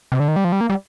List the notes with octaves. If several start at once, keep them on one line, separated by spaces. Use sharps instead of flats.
C3
D3
D#3
G3
F3
G3
A#3
G3